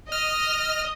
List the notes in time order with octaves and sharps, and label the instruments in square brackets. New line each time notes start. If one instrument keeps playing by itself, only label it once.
[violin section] D#5 [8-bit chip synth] F6